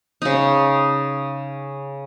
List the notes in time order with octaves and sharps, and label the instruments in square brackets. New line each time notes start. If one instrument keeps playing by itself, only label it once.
[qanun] C#3 D#4